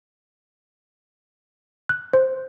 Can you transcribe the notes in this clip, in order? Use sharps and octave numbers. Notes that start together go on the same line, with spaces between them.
F#6
C5